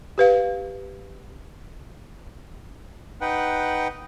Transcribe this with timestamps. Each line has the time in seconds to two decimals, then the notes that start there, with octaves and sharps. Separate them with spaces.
0.18 G4 B4 F5
3.21 D#4 B4 F#5 G5